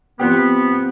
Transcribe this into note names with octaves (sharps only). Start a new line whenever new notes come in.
F3 B3 C4 G4